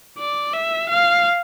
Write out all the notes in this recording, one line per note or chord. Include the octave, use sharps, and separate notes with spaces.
D5
E5
F5